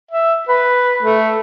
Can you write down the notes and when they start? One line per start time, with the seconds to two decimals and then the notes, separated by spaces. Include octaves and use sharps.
0.11 E5
0.48 B4
1.03 A3